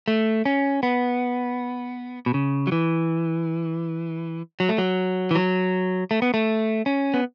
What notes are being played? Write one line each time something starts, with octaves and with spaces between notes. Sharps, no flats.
A3
C#4
B3
B2
C#3
F#3
E3
F#3
A3
F#3
E3
F#3
A3
B3
A3
C#4
B3